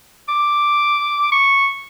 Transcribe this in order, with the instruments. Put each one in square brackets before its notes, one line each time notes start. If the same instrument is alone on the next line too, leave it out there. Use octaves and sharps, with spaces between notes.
[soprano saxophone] D6
C#6